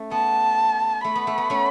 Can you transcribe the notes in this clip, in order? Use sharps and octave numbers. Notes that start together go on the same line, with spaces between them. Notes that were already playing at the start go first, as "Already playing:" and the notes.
Already playing: A3 C#4
B3 A5
A3 B5
B3
A3
B3
A3 C#4